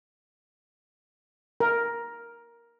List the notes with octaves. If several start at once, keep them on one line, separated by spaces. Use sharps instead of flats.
A#4